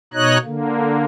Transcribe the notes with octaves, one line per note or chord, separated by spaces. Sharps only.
B2 D#4 C#5 D#5 F#6
D3 A#3